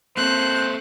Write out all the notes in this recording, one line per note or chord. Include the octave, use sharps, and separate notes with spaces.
A#3 C4 A4 C5 F#6